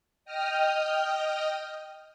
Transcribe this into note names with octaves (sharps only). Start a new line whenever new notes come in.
D#5 G5 D#6 F6